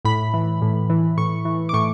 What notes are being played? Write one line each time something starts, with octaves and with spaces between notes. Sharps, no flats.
A2 B5
E3
A2
E3
A2 C#6
E3
D6
A2 C#6